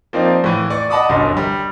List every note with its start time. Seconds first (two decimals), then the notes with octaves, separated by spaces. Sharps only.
0.13 F3 A#3 C4 D#4 D5
0.44 A2 E3
0.70 D5 C#6
0.90 D#5 F#5 A5 B5 D6 D#6
1.09 G1 C2 F#2 D#5 C6
1.37 G3